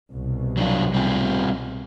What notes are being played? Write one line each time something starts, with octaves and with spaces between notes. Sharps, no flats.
C2 B2
F#3 D4 F4
G3 C4 F4